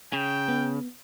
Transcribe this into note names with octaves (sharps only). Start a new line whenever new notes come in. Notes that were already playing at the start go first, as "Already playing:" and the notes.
C#3 G5
B3